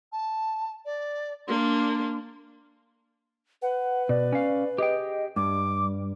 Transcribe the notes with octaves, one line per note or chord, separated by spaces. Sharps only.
A5
D5
A#3 D4 C6
B4 F#5
B2 D5
C#4 F5
G4 G#4 D#5 G5
G2 G3 D6